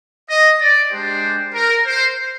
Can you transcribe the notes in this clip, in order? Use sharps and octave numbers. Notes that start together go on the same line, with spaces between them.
D#5
D5
G#3 D4 G4 C5
A#4
C5